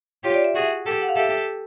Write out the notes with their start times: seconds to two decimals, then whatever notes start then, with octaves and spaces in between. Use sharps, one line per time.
0.24 F4 G4 C#5
0.34 D5
0.44 E5
0.55 F#4 G#4
0.86 G4 A4
1.02 F#5
1.09 F5
1.16 G4 A4 E5